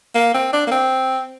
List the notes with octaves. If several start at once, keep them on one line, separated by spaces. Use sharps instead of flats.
A#3
C4
D4
A#3
C4